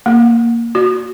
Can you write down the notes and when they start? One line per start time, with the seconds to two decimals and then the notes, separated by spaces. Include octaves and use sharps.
0.06 A#3
0.75 F#4